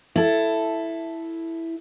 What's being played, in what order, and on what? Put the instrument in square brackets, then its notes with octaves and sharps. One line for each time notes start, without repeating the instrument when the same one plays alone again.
[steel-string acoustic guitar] E4 A4